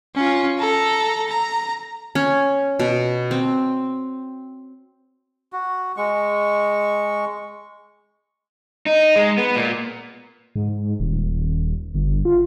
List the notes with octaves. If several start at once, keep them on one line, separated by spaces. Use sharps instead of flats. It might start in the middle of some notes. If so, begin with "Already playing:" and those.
C#4 F4
A4 A#5
A#5
C#4
B2
C4
F#4
G#3 C#6
D#4
G#3
B3
A#2
G#2
D#1
G1
F4